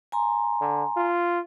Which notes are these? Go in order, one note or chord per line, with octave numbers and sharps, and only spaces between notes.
G#5 A#5 C6
D3
F4